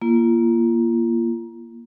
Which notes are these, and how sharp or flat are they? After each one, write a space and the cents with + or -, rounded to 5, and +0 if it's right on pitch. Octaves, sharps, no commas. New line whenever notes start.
A#3 +15 F4 -35